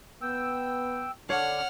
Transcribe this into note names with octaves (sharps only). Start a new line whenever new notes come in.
B3 G5 E6
D3 D4 C#5 F5 F#5 F6